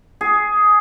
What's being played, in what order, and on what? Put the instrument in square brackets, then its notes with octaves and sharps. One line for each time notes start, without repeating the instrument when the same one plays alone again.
[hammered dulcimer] G#4